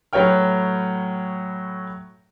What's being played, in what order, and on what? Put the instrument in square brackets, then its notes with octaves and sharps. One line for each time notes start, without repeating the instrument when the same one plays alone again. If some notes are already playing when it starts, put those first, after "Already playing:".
[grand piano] A2 F#3 B4 C#5 G5 F6